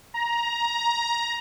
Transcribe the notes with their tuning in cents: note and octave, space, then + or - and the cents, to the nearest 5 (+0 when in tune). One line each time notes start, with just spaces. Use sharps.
A#5 +15